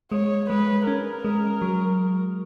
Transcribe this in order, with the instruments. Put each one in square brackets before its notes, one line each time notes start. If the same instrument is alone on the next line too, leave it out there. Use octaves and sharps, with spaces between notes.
[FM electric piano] G#3 [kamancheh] C#5
[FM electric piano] G#3 [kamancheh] B4
[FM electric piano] C#4 [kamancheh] A#4
[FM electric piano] G#3
F#3